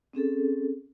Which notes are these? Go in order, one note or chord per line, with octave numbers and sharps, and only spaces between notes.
C4 C#4 G#4 A4